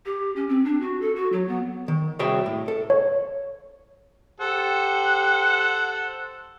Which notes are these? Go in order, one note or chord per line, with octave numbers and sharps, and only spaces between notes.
G4
C#4
C4
D4
F#4
A4
F#4
F#3
B3
D#3
C2 F#4 G#4 C#5 E5 G5
A2
A4
C#5
G4 A4 C5 F#5